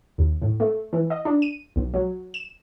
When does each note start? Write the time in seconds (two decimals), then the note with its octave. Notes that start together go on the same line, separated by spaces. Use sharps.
0.18 D#2
0.42 A2
0.60 A3
0.93 E3
1.10 D#5
1.25 D4
1.42 D#7
1.76 B1
1.94 F#3
2.34 E7